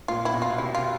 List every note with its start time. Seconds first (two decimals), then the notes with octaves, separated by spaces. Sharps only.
0.08 A#2 F4
0.25 E4
0.34 B2
0.42 F4
0.58 C3 E4
0.75 F4